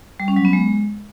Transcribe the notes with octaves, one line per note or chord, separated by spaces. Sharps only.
G3
C#4
F#3
B3
G#3